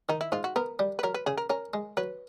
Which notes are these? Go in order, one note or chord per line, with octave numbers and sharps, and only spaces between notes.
D#3 D#4
E4
G#2 F4
F#4
B3 A#4
G3
B4
F#3 A#4
B4
C#3 G#4
A#4
C#4 A#4
G#3
F#3 B4